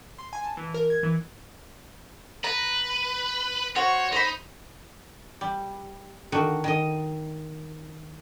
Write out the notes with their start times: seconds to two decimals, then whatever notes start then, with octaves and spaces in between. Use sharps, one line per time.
0.18 C6
0.33 G#5
0.44 A5
0.57 E3
0.74 A#4
0.90 G#6
1.03 E3
2.44 B4 A#5
3.76 F#4 C5 C#5
4.12 D#4 C5 B5
5.41 G3
6.32 D3 D#3 F#4
6.64 D#3 D#5